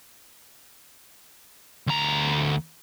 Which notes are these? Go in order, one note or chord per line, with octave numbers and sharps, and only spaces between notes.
D2 A#5